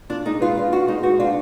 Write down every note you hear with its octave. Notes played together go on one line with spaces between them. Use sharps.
D4 F4
G#3 D#4
F4 B4
D4 F4
F4 F#4
G#3 D#4
F#4 B4
D4 F4